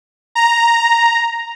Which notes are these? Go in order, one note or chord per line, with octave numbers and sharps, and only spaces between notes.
A#5